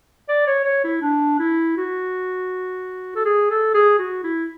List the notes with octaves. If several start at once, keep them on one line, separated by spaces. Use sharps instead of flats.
D5
C#5
C#5
E4
D4
E4
F#4
A4
G#4
A4
G#4
F#4
E4